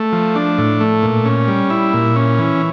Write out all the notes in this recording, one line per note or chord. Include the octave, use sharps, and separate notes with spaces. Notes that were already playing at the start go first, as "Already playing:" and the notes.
Already playing: A3
F3
D4
A2
A3
A#2
C#4
G3
E4
A#2
C#4
E3